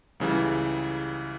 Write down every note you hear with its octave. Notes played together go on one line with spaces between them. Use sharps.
C#2 C#3 E3 G3